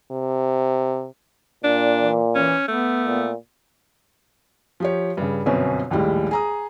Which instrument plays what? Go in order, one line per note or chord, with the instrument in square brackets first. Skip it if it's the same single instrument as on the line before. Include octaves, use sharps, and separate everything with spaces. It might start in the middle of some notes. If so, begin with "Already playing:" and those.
[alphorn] C3
[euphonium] A#2 [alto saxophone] D4
[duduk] E3
[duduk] E3 [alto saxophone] C#4
[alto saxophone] A3 [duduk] B3
[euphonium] A#2
[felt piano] F3 G4 C#5
G2 C#3
G1 F#2 B2 C4 C#4 B4
A#1 D#2 A2 G3 G#3
G#4 A#5 D#6